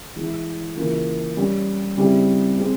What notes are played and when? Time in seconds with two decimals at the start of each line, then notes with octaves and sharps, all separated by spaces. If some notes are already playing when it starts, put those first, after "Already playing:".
0.16 E3 G#3 E4
0.76 C#3 E3 A#3 F4
1.37 G3 C#4 G4
1.97 C#3 G3 C4 E4 G4
2.58 G#3 C4